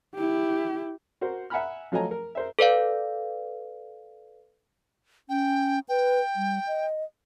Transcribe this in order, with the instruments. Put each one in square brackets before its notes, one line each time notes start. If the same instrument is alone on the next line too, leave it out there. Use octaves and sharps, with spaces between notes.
[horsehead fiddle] E4 G4
[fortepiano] F#4 A#4 C5
E5 F#5 G#5 A#5 B5 F6
F3 F#3 A3 D#5 G#5 A#5
A#4
A#4 C5 E5
[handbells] A4 B4 D5 F5
[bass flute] C#4 [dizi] G5
[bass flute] B4 [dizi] G5
[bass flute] G3
D#5